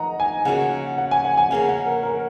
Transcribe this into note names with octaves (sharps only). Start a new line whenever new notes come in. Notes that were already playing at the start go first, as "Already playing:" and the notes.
Already playing: D#3 D#4 D#5 F#5 A#5
G#5
C#3 A#3 F#4 F#5
F#5
G#5
F#5
G#5
C#3 A#3 C#4 F#5
F#5
A#4
A#4